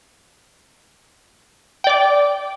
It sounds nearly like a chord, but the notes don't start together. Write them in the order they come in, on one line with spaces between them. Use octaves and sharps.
G5 D5 D6